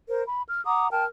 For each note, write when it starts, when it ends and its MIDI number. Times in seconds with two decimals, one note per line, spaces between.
0.09 0.23 70
0.09 0.23 72
0.27 0.41 83
0.47 0.63 89
0.66 0.88 78
0.66 0.88 82
0.66 0.88 86
0.66 0.88 87
0.92 1.06 70
0.92 1.06 79
0.92 1.06 81
0.92 1.06 89